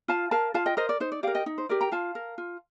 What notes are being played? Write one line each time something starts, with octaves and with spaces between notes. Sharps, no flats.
F4 F5 A5
A#4 F5 A5
F4 F5 A5
D#5 G5
A#4 C5 D#5
D5
D#4 C5
D5
G4 A#4 D5 F5
D#5 G5
D#4
C5
G4 A#4 D5
G5 A#5
F4 F5 A5
A#4
F4